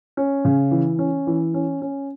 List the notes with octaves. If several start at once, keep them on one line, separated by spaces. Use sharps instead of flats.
C#4
C#3
E3
C#4
E3
C#4
C#4